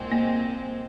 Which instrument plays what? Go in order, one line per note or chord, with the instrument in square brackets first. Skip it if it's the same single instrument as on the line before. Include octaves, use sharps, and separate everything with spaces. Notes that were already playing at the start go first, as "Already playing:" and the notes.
Already playing: [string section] C2 A#2 G#3 C4
[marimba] A#3